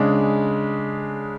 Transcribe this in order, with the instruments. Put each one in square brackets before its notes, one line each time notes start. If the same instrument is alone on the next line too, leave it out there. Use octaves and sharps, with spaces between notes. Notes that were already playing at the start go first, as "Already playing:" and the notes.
Already playing: [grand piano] C#3 G#3 D4